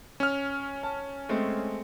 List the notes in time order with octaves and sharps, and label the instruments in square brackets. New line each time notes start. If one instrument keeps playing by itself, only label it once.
[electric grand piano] C#4 F6
[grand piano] A5
G#3 A3 C4